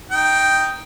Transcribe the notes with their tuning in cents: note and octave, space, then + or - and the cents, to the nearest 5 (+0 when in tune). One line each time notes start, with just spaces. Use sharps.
D#4 +0 G5 +0